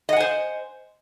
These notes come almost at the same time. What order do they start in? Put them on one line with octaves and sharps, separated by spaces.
D#5 F#5 G#5 C5